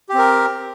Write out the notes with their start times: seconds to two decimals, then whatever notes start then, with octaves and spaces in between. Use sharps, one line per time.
0.09 G4
0.14 C4
0.19 A#4